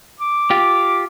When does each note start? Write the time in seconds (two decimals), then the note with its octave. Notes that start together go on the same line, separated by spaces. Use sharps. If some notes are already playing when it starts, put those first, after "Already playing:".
0.20 D6
0.51 F4 G4